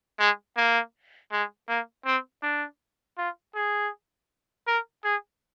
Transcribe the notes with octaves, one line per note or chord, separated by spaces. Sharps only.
G#3
A#3
G#3
A#3
C4
D4
F4
G#4
A#4
G#4